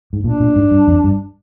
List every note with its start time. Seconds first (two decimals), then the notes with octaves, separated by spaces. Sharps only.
0.13 G#2
0.24 A#2 D4
0.40 A#2
0.56 G#2
0.71 G2
0.88 F2
1.04 G2